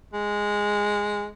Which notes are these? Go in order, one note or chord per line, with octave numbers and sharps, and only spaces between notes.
G#3